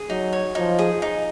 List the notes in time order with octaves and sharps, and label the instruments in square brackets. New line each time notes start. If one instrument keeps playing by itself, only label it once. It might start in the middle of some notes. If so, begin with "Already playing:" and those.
Already playing: [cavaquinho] G#4
[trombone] F#3 [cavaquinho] D#4
[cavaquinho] C#5
[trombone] F3 [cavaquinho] D#4
[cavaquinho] G#4
D#4